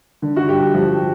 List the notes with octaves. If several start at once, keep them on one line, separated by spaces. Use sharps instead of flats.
D3
F#4
G2 G4
F3 G4